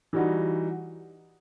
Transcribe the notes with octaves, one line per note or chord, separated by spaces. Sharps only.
E3 G3 D#4 F#4